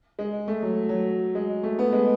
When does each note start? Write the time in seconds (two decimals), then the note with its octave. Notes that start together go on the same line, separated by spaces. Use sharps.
0.19 G#3
0.48 A3
0.62 F#3
0.89 F#3
1.35 G#3
1.63 A3
1.79 B3
1.92 G#3